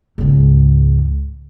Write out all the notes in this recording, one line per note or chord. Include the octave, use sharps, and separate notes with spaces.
C#2 G#2